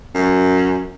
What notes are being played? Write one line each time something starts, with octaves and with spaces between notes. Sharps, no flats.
F#2